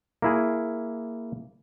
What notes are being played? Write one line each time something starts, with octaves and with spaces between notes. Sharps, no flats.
A#3 E4 G#4